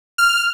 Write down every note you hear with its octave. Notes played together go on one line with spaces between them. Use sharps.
F6